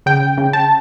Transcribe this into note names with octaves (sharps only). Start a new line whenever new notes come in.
C#3 G5
C#3
A5